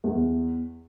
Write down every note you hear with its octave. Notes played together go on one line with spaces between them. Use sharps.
E2